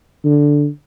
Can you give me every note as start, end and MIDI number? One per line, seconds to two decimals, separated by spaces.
0.25 0.67 50